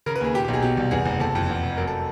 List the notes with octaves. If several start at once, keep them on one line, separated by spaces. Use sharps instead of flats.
C#3 A#4
B4
D#2 G#4
A#2 G4
G4
B1
G#4
B2 G4
C2
E2 G#4
F#1
C3 A4
F2
E2
F1
F#2 A#4
A4